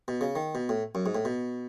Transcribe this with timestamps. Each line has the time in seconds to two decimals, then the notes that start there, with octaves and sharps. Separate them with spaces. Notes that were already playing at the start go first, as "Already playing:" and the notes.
0.08 B2
0.21 C#3
0.36 D#3
0.55 B2
0.69 A2
0.95 F#2
1.06 G#2
1.15 A2
1.25 B2